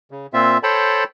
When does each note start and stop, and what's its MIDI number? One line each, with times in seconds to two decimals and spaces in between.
0.11 0.27 49
0.33 0.58 46
0.33 0.58 60
0.33 0.58 65
0.33 0.58 76
0.63 1.04 69
0.63 1.04 72
0.63 1.04 73
0.63 1.04 79
0.63 1.04 81
0.63 1.04 83